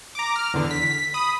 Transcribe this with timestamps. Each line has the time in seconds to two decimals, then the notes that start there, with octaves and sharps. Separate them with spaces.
0.15 A#5 D6
0.36 F6
0.54 E2 D3
0.71 B6
1.14 B5 D#6